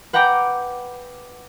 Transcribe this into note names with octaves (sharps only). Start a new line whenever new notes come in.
B4 F#5 G5 A#5 D6